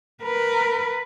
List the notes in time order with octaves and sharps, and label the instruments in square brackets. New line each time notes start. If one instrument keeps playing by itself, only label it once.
[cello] A#4 B4